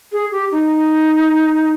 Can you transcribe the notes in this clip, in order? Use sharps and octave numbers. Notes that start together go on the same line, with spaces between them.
G#4
G4
D#4